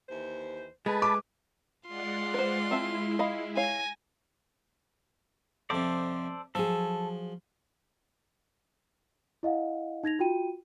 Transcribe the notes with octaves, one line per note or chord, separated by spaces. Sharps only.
D#2 E3 C5
G#3 A3 G#4 B4 A5 B5
D6
G#3 F4 D5 F#5 C6
B4 C5
G#3 C4 E4 E5 A5
D#5 F5 B5
C#5 F5 G#5 A#6
F2 C3 A4 C5 D5
F3 F#3 G#4 A4
E4 D#5 F5 F#5
D#4 G#6 A#6 F7
F4 F#4 G5 D#7